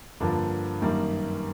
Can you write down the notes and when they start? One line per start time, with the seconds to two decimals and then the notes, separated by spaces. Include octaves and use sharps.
0.20 G2 D3 F3 A#3 D4
0.81 F#2 D#3 G3 A#3